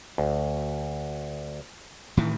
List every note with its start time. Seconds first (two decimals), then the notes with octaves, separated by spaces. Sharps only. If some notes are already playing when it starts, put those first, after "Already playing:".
0.18 D2
2.17 A2 D#3 E3